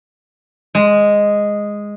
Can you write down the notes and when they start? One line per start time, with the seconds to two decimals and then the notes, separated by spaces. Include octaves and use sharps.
0.75 G#3